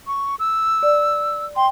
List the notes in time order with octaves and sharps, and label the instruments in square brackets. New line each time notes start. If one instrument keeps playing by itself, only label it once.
[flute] C#6
E6
[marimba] D5
[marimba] G5 [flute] C6